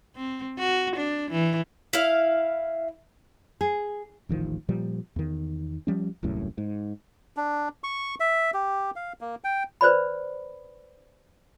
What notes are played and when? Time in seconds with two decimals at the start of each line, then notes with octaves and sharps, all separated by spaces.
0.16 C4
0.59 F#4
0.96 D4
1.31 E3
1.93 E4 F5
3.61 G#4
4.29 D#1 A1 D#3 F3
4.69 A#2 F3 G3
5.16 E2 D#3
5.87 F3 G3 C#4
6.23 D#1 C2 F#2 A2
6.58 G#2
7.37 D4
7.84 C#6
8.20 E5
8.54 G4
8.96 F5
9.21 A#3
9.44 G5
9.81 B4 C5 D5 B5